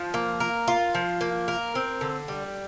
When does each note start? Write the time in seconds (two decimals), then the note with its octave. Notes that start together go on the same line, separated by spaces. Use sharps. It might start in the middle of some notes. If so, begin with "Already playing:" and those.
Already playing: F3
0.14 A#3
0.40 A#4
0.68 F4
0.94 F3
1.21 A#3
1.48 A#4
1.75 C4
2.01 D3
2.28 G3